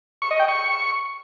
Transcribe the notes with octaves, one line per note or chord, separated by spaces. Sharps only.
C#6
D#5
G5
C#6